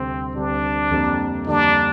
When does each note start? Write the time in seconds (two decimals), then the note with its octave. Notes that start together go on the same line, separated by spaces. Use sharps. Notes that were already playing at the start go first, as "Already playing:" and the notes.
Already playing: D2 C3 G3 C4
0.36 D2 C3 G3 D4
0.91 F2 D3 G3 A#3
1.47 F2 D3 G3 A#3 D4